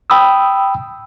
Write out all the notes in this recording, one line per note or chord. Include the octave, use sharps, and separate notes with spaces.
G5 B5 D#6 E6